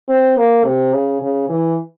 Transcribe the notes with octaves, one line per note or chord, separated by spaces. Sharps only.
C4
A#3
C3
C#3
C#3
E3